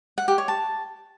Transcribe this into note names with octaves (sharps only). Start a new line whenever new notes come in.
F#5
G4
C#5
A5